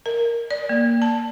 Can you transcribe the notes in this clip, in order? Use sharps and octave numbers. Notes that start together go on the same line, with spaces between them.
A#4
D5
A#3
A5